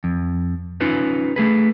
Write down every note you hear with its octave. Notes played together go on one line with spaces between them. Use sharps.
F2
C#4 D#4 F4 B4
A3 G#4 B4